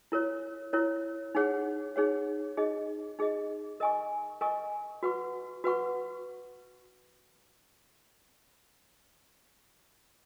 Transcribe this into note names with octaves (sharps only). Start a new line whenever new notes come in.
E4 A#4 C#5
E4 A#4 C#5
D#4 G#4 C#5 F#5
D#4 G#4 C#5 F#5
D#4 G#4 D#5
D#4 G#4 D#5
A#4 D#5 G#5 C#6
A#4 D#5 G#5 C#6
F#4 B4 F#5 C#6
F#4 B4 F#5 C#6